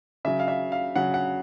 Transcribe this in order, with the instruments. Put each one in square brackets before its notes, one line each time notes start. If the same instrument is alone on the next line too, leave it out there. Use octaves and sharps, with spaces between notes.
[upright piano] C#3 F#3 E5
F5
E5
F5
C#3 F#3 F#5
F#5